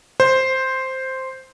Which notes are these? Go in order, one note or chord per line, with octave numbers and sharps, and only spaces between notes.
C5